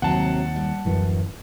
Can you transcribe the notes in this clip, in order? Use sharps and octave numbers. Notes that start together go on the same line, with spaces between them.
D#2 C3 F#3 F#5 A5
G3
D1 F#2 E3